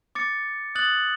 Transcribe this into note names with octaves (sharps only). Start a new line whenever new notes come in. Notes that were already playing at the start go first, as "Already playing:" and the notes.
D6 A6 C#7
D#6 F#6 A6 F#7